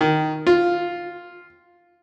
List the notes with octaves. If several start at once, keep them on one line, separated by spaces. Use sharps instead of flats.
D#3
F4